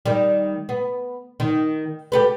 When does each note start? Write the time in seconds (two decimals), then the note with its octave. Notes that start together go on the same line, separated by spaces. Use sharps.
0.06 D#3 G3
0.69 B3
1.40 D#3
2.12 G4 A4 B4